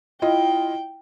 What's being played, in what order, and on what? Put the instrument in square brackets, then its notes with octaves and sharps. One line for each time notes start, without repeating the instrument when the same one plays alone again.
[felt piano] E4 F4 D#5 [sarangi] G5